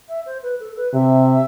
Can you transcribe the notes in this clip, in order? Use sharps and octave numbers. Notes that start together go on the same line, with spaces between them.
E5
C5
B4
A4
B4
C3 E5